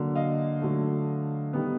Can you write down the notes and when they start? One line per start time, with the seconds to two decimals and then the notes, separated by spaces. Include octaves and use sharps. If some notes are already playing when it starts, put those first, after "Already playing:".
Already playing: D3 F#3 A#3
0.15 D#5 F5
0.61 D3 F#3 A3
1.53 D#3 G3 B3